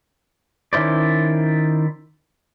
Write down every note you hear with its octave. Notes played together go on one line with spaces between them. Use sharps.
D#3 C#4 E4 C5 D5